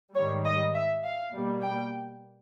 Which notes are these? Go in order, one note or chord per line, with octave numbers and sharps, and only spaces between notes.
G#2 D#3 G3 C#5
D#5
E5
F5
B2 G3 A#3
G5